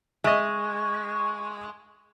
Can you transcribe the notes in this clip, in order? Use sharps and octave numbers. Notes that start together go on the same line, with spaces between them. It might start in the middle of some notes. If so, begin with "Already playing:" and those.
G#3 D#5 E5 C#6